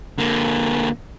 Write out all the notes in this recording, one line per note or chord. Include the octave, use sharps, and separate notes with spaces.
D3 A#3